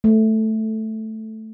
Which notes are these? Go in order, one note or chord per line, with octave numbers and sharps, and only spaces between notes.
A3